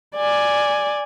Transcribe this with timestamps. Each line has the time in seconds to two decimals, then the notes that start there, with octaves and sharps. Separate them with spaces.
0.16 D5 G#5